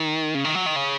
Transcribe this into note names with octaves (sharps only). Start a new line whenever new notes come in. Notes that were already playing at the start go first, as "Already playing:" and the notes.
Already playing: D#3
C#3
D#3
F#3
D#3
C#3